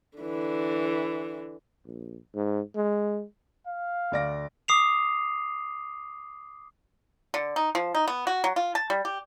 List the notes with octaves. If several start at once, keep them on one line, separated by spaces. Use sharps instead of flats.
D3 E3
A#1
G#2
G#3
F5
D2 D5 A#6
D6 D#6 C7 F7
D3
D#4
F3
D#4
B3
F#4
F#3
F4
A5
G3
G4